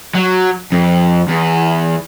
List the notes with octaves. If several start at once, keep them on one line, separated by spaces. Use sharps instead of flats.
F#3
F2
E2